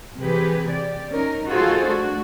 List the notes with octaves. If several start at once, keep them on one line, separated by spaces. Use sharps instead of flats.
C3 E3 G4 G#4 B4
G4 D5
C#4 D#4 A#4
D#4 F4 F#4 G#4 A4 C5
A3 D4 F#4